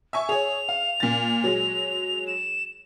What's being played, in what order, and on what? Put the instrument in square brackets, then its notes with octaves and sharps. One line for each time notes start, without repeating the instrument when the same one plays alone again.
[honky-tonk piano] E5 G#5 C#6
[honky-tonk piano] G#4 C#5 [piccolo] F7
[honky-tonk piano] F5
A#2 A6
F#3 G#3
[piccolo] E7